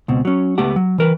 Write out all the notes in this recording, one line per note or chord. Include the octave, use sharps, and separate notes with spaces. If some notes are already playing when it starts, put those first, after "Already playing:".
C#2 B2 C4
F#3 C#4
C#2 A3 B3 G4 F#5
F#3
E3 A#4 B4